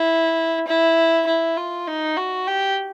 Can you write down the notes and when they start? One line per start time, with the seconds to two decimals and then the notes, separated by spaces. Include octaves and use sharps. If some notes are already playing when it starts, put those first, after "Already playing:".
Already playing: E4
0.68 E4
1.27 E4
1.57 F4
1.87 D#4
2.17 F#4
2.47 G4